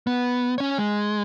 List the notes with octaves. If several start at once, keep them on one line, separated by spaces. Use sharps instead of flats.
B3
C#4 C#5
G#3